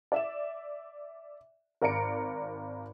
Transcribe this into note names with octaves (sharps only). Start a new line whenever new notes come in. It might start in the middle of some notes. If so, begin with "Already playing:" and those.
D5 E5 E7
G#1 A#4 D5 A#5 C#7 D7